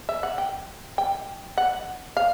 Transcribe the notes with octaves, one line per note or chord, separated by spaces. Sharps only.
E5
F#5
G5
G5
F#5
F5